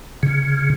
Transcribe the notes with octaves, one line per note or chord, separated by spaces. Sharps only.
C#3